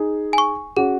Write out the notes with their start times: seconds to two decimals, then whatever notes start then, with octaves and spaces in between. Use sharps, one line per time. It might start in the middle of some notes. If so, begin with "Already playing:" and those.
Already playing: D#4 G#4
0.33 G#5 C#6
0.77 C#4 F#4 G#4